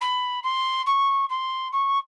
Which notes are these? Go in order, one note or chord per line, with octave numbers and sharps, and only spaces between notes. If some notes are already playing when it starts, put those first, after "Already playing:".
B5
C6
C#6
C6
C#6